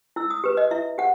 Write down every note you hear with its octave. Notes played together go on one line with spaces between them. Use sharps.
E4 E6
D#6
G4 B4
D#5
E4 E5
G4 F#5